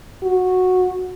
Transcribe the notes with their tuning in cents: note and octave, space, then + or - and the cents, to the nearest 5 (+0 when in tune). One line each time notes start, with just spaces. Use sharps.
F#4 -10